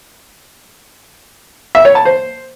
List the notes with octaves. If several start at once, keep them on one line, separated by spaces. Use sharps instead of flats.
E5
C#5
A5
C5